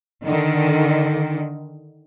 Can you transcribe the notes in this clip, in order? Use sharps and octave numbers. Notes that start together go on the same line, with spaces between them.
D3 D#3